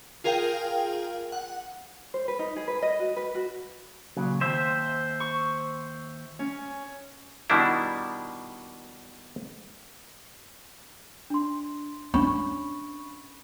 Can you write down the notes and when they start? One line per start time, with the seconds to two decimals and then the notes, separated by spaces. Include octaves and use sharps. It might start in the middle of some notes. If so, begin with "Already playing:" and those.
0.24 F4 G#4 A#4 F5 G5
1.32 F#5
2.14 C5
2.28 B4
2.39 D#4
2.56 G#4
2.68 B4
2.83 D#5
2.99 F#4
3.16 B4
3.35 F#4
4.17 A#2 C#3 F#3
4.41 D#2 C5 E5
5.20 C#6
6.39 C#4
7.50 B2 D#3 G3 D4 E4
11.30 D4 C6
12.14 C#4 D4 B5 C#6